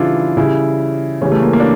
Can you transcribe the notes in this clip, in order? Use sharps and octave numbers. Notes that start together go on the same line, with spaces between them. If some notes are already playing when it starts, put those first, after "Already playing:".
Already playing: C#3 E3 G3 D4 E4 F4
C#3 G3 E4
C#3 E3 G3 C#4
A3
A#3
A#3
D4